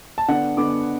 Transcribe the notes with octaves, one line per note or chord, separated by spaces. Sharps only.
A5
D3 B3 D4 F#5
D3 B3 D4 D6